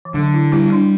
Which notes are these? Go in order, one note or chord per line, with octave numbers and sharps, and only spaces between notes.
E3
D3 F#3
E4
G3 E4
D4